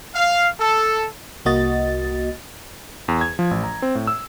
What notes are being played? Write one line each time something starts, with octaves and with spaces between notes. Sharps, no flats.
F5
A4
C2 A#3 F#4 D#5 A6
E2
G#6
F3
A1
A#5
C4
A2
E6